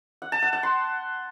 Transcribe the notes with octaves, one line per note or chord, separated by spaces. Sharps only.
F#5
A5
F#5
F#5
C6